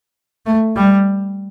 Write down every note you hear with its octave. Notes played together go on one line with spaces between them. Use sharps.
A3
G3